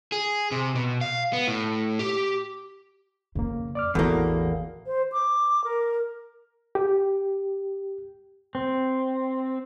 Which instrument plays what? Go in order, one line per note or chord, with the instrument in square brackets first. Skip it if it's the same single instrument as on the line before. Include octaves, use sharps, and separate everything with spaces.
[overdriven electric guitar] G#4
C3
B2
F5
B3
A2
G4
[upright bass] F2 [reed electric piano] C#3 A#3
[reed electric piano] D5 D6 F6
[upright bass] A1 [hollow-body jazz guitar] E2 A#3 [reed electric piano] E4 F#4 A4
[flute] C5
D6
A#4
[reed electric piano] G4
[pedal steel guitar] C4